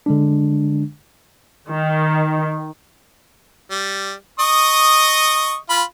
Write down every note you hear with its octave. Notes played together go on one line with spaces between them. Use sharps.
D3 G#3 D4
D#3
G3
D#5 C#6 D#6
F4 B5